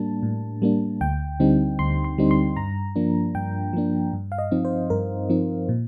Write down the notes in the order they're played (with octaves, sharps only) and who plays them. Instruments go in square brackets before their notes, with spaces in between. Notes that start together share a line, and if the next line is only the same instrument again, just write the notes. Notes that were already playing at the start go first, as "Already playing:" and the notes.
Already playing: [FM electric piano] A2 G3 A#3 D4 A5
A2
G3 A#3 D4
D2 G5
D3 G3 C4 D#4
D2 C6
C6
D3 G3 C4 D#4
C6
G2 A#5
F3 A#3 D4
G2 G5
F3 A#3 D4
G2
F5
D#5
F3 C4 D#4
C5
G2 A#4
F3 C4 D#4
A#2